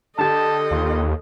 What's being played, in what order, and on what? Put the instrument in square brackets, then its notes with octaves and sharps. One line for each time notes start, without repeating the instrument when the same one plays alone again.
[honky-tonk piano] D3 G4 [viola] A4 D#5 [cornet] A5
[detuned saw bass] D#2 [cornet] F4